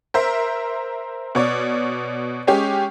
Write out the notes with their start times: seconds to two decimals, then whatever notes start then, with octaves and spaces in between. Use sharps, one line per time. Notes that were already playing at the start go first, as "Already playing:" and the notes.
0.14 A#4 C5 E5
1.35 B2 C#5 D5
2.47 G#3 C#4 G4